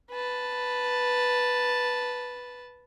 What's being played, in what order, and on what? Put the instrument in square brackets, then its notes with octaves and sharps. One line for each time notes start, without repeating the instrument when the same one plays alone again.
[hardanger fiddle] B4 A5